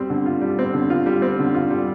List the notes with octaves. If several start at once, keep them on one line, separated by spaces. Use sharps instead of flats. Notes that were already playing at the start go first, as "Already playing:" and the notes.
Already playing: G3 C4
D3
F4
G3
C4
D3
F4
G3
C4
D3
F4
G3